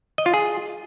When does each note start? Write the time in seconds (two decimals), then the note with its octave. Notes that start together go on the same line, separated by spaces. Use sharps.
0.18 D#5
0.26 F4
0.34 G#4